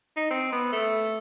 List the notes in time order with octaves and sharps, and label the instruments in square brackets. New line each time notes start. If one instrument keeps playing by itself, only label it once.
[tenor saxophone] D#4
C4
B3
A3